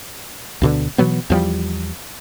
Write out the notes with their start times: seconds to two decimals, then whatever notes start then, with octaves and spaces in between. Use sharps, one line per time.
0.62 D2 B2 D3
0.98 B2 E3 F#3 B3
1.30 E2 F3 G3